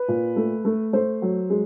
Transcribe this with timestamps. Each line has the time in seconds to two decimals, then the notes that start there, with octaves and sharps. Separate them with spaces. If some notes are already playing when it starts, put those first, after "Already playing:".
Already playing: B4
0.08 A#2
0.36 A3
0.65 A3
0.93 A3 C5
1.22 F#3
1.50 G#3